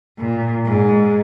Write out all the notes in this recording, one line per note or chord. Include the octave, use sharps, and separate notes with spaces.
A#2
G#2